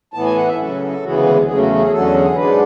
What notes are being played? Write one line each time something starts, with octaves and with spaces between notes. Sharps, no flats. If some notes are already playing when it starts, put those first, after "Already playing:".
A2 E3 B3 A5
G#5
F#5
E5
C#3 F#3 C#4 A4
D2 C#3 E3 G#3 B3 F#4
G#4
G#4
E2 C#3 F#3 A3 C#4 G#4
F#4
G#4
E2 D3 F#3 C#4 A4
G#4
G#2 G#3 D4 B4